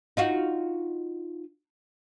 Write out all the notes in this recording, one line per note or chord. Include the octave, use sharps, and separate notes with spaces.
D#4 F4 F#4